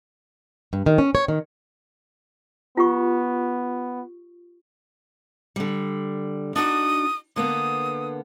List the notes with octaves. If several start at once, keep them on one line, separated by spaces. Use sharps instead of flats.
G2
D#3
C#4
C#5
D#3
B3 F4 G4 C#6
D3 G3
D4 D#4 F#4 D#6
D3 A#3 B3 D#6